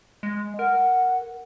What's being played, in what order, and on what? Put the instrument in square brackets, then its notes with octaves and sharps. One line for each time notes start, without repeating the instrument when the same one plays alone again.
[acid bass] G#3
[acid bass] A#4 [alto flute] F#5